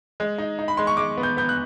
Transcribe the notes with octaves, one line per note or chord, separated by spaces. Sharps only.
G#3
D#4
D#4
B5
G#3 C6
C#6
G#3 D6
B3
G6
B3 G6
F#6